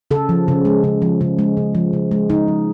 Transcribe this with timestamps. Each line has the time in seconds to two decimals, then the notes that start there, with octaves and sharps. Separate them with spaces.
0.11 C#3 A4
0.29 F3
0.48 C#3
0.65 G#3
0.84 C#3
1.02 F3
1.21 C#3
1.39 G#3
1.57 C#3
1.75 F3
1.93 C#3
2.11 G#3
2.30 C#3 D#4
2.48 F3